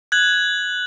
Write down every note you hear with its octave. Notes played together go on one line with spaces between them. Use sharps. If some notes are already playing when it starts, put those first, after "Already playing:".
F#6 G#6 F#7